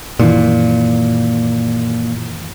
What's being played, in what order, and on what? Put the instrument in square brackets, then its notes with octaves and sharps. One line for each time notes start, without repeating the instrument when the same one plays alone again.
[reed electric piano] F#2 D#3 E3 [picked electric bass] A#2